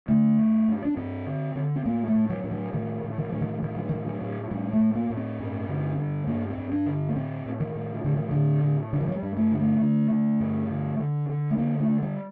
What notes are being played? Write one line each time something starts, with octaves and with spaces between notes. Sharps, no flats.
D3 A3
G2
G2
D4
G2 C4
D3
D3
C4
A2 A#3
A3
A2
F#3
A2
F#3
A2 D#3
A2
D#3
A2 F#3
D#3
A2 D#3
F#3
A2 D#3
F#3
A2
A2 G3
A3
A2
A#3
A2
C4
G2
D3
G2
G2 A#3
C4
G2
D4
D3
A#3
A2 C4
A2
D#3
A2
A2 D3
D#3
A2 D3
A2
G2 D3
D#3
F#3
G3
G2
A3
D3
A3
D3
D3
G2
D3
D3
D3
A3
D3 A#3
A3
D3
G3